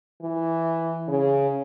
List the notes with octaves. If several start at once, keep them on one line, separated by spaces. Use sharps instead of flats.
E3
C#3